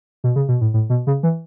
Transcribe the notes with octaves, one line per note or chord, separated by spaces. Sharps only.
B2
C#3
B2
A2
A2
B2
C#3
E3